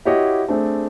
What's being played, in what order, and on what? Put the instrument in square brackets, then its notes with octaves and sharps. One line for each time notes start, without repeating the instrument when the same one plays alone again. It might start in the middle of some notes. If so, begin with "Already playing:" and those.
[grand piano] E4 F#4 G4 C#5 D#5 F#5
A3 C4 D4 G#4